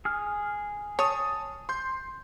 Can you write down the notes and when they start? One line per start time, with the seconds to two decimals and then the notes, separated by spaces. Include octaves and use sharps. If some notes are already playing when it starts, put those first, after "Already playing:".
0.05 G#4 F6
0.99 C#5 A5 D#6
1.69 C6 G6